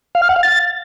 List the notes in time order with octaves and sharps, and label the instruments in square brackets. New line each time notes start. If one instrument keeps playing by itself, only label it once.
[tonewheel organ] F5
F6
F#5
F5
A6